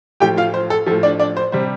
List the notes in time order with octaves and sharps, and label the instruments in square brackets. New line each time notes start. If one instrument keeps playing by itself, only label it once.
[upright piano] A2 F3 G4 G5
F4 F5
C5
A4
F3 A4
A2
D4 D5
D4 D5
C5
C3 G3 C5